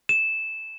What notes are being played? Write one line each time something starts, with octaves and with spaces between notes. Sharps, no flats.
E7